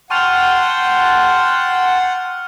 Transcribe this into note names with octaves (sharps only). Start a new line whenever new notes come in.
F#5 G5 A5 C6 C#6 F6 F7